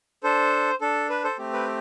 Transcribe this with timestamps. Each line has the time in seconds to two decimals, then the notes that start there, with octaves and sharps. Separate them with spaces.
0.23 D4 A4 C5
0.81 D4 A4
1.10 B4
1.24 A4 C5
1.38 A3 C4 G4
1.53 B4